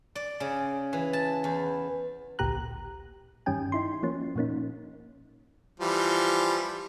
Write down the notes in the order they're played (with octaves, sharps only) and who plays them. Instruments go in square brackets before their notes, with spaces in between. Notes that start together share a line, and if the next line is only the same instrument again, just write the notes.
[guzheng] D5
C#3
E3
A5
E2
[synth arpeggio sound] A1 D2 A#2 G4 A#5 F#6
G2 D#3 G3 C#4 G5 G#5
D#4 E4 C6
F3 A#3 C#4
A#2 F3 A#3 C#4 D#4
[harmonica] E3 F3 G3